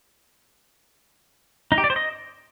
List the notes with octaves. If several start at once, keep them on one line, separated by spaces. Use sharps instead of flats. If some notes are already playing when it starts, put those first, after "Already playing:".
D#4
G4
D5
C5
D#5